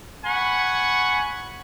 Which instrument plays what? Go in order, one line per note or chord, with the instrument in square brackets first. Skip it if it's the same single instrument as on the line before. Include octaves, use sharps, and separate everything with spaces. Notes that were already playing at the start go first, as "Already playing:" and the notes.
[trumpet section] F#5 G#5 B5 C#6